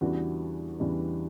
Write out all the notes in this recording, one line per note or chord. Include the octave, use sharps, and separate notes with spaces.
E2 C#3 E3 G3 D4 F#4
E2 C#3 E3 G3 D4